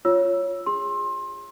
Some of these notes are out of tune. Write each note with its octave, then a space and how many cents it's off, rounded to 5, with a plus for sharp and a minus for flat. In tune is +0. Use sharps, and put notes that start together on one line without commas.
F4 +0 C#5 +0 E6 +0
G#4 -30 C6 +25